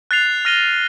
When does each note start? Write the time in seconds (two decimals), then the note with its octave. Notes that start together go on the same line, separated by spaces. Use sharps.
0.11 F#6 A6 C7 F7
0.45 F6 A#6 D#7 G7